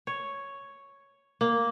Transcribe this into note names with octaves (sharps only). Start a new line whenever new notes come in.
C#5
A#3